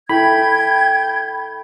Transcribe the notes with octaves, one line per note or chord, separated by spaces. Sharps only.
E4 A4 G5 B5 G#6